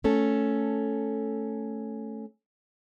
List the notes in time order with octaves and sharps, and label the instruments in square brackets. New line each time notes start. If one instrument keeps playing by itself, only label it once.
[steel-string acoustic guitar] A3 C#4 A4